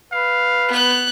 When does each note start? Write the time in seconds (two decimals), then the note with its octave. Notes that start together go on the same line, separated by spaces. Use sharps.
0.12 B4 F5
0.69 B3 F#6